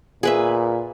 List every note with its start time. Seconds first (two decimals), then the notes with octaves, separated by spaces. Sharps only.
0.23 A#2 G#4 B4 E5